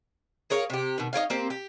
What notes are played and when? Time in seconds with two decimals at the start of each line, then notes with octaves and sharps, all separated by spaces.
0.50 G#4 A#4 C#5 F5
0.70 C3 G4
0.98 B2 D#3
1.13 D#4 G4 C#5 F5
1.30 A#3 C4 G4
1.50 G4